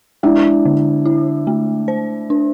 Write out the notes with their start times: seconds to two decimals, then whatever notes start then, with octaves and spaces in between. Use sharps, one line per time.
0.23 G#3 D4 E4
0.65 D3
1.06 E4
1.47 A3
1.88 C5
2.30 D4